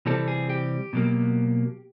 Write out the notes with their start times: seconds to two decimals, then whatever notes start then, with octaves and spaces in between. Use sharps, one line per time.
0.06 C3 E3 G3 C4 A4
0.28 G#4
0.50 G4
0.93 B2 F#3 A#3